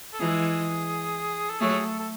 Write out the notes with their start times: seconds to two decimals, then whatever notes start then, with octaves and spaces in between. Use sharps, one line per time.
0.13 A4
0.19 E3 G#3 G#4
1.50 A4
1.60 F#3 A3 G#4
1.85 A4
1.99 A4